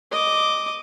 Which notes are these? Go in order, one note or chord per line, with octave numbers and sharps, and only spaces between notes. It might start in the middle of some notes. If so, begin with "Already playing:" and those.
D#5 D6